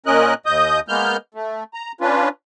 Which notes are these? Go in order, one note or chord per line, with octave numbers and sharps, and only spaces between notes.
A#2 C#4 A#4 D#5 F#6
D#2 D#5 D#6 G6
G#3 A#3 B3 F6 G6
A3
A#5
C#4 D4 F4 B4